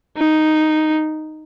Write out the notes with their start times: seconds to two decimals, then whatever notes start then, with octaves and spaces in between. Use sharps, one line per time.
0.17 D#4